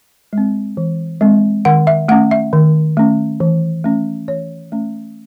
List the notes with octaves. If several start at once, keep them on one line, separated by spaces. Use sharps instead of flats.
G#3 C4
E3
G#3 C4
D#3 F#5
E5
A3 C#4 F#5
E5
D#3
A3 C#4
E3
A3 C#4
E3 C#5
A3 C#4